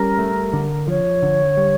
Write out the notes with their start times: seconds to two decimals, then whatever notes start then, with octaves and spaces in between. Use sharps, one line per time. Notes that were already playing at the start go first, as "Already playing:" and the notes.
Already playing: G3 C#4 A#4
0.19 A3
0.53 D3
0.88 F3 C#5
1.23 D3
1.57 G3